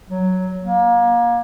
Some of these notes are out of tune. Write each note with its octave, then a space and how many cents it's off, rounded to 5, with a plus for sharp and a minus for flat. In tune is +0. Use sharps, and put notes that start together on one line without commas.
F#3 +5
A#3 +25